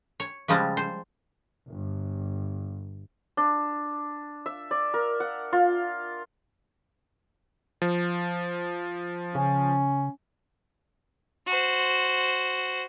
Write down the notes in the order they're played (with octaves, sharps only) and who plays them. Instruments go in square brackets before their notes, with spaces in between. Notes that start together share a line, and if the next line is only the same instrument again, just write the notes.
[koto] C#5
C#3 F3 G3 G#3
C5
[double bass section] G1
[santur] D4
E5
D5
A#4
F#5
F4
[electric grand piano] F3
[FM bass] C#3 [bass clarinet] C#4
[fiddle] F#4 C5